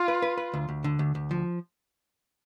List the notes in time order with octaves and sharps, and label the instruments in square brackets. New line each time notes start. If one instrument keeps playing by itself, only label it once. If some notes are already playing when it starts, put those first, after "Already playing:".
Already playing: [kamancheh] F4
[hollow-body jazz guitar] B4
B4
B4
D2
D2
D3
D2
D2
F3